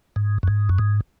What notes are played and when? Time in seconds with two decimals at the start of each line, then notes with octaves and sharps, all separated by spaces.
0.16 G#2
0.43 F#2
0.48 G#2
0.69 F#2
0.79 G#2